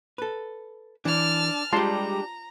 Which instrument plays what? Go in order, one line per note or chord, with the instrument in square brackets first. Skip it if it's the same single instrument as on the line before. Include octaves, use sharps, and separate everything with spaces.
[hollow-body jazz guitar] A4 B4
[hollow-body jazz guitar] E3 [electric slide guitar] D4 D5 [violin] A5 F6
[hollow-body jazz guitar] G3 G#3 [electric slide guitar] D4 G4 [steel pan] F4 A5 C6 [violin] A#5